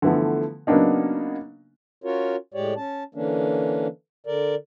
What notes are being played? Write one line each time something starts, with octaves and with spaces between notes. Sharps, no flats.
D3 E3 F3 A3 B3
C#3 F#3 A#3 B3 D4 D#4
C#4 F4 F#4 A#4 C#5
A2 G#3 G4 C#5 D5
C#4 A5
D3 E3 A#3 C#4 D4
D3 A#4 D5